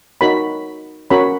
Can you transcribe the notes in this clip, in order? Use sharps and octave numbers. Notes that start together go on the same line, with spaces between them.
D#4 F#4 A#4 C#5 B5
C#4 F#4 A#4 C#5 B5